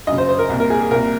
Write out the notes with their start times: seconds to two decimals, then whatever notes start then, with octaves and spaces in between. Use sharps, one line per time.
0.07 F#2 D#5
0.12 C#3
0.18 C5
0.29 C5
0.39 A#4
0.49 C2 A#2
0.60 A#4
0.70 G#4
0.80 G#4
0.91 C2 A#2 A#4